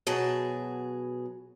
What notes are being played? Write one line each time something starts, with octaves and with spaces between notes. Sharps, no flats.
B2 F#3 G#4 A5